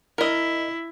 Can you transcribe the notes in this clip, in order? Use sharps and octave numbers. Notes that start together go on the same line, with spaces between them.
E4 A#4 D#5